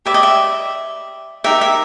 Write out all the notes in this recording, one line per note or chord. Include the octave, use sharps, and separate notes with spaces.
G4 B4 D5 E5
D#5
E5
D#4 G4 A#4 E5
E5